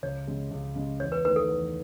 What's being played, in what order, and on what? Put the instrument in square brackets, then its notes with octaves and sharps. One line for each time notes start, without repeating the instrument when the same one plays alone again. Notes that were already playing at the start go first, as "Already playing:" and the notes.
[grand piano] C#2 [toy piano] C#5
[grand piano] C#3 G#3
C#2
C#3 G#3
[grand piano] E2 [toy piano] C#5
[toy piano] B4
[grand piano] D#3 A3 [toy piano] B4
[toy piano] A4
[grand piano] E2